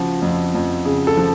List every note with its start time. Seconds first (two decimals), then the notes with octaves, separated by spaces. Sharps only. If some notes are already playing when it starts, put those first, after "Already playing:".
Already playing: C#3 F3 F#4
0.22 F2
0.55 F2
0.85 C#3 G#4
1.07 A4
1.17 F3